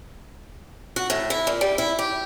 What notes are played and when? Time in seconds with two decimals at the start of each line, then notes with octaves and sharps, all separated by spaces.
0.96 F#4
1.10 A2
1.30 E4
1.47 A#2
1.61 G3
1.78 E4
1.99 G4